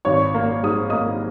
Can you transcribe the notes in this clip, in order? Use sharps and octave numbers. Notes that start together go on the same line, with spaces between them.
G#1 C#5 C#6
A#3
G#2 D#6
A#3 D#5 D#6